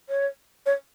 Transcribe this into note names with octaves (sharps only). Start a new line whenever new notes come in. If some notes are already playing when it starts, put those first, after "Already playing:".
C#5
C#5